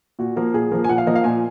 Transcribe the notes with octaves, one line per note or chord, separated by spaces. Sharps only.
A#2 F#4
F3 A#3
A#2 G#4
F3 A#3
G#5
A#2 F#5
F5
F3 A#3 D#5
F5
A#2 G#5